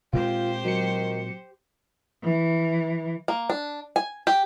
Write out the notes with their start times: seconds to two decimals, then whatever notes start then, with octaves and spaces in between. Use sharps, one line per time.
0.13 A#2 G#3 C4 F4 G4 C5
0.65 D#3 F#3 C#7
2.23 E3
3.28 A#3
3.50 D4
3.96 G#5
4.27 G4